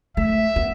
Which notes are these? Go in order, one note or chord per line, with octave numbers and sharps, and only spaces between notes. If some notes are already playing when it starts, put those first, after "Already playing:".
A3 E5
B3